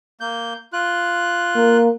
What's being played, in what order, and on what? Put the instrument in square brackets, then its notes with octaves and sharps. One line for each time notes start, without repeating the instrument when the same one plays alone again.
[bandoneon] A#3 G6
F4 F#6
[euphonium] A#3